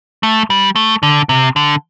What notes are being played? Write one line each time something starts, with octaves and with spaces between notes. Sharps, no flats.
A3
G3
A3
D3
C3
D3